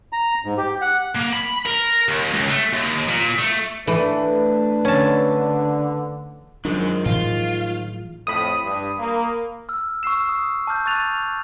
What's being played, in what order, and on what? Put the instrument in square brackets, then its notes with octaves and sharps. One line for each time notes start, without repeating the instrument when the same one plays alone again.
[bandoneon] A#5
G#2
G4
F#5
[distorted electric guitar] A#3
B5
A#4
D#2
C#2
A3
D#2
A#2
A3
[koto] E3 [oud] A3 [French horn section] D4 B4
[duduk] D3 [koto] C#4 A5
[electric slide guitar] F#2 F#3 [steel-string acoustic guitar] D#3 F3 G#3 [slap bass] D4
[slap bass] A2 E3 F#3 [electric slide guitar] F4
[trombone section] F2 A2 [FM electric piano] B5 D#6
[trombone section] G2
A#3
[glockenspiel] E6 F6
C#6 E6 C7 E7
D#6
A5 D6 F6 G6
C#6 F#6 A6 D#7 F7